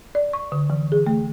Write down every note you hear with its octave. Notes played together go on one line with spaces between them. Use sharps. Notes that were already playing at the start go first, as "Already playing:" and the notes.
D5
C#6
D3
E3
G#4
A3